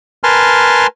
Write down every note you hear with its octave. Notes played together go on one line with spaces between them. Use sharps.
A#4 B4 G#5 A5 C6 F6